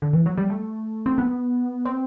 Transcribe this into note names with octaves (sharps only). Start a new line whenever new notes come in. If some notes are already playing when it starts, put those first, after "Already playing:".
D3
E3
F#3
G3
A3
C4
B3
C4